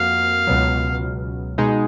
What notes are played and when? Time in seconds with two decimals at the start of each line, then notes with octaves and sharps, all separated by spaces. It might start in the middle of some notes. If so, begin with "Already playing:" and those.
Already playing: F2 A#3 F#4 F5
0.47 C#2 B2 F#3
1.58 B2 G#3 D#4 G#4